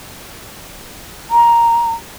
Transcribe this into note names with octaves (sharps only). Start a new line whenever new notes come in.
A#5